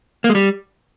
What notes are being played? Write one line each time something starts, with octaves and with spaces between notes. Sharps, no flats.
A#3
G#3
G3